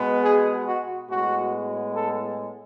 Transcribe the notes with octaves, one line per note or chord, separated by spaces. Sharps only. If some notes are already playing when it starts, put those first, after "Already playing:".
Already playing: B2 G#3 B3
G#4
F#4
A2 G#3 B3 F#4
A4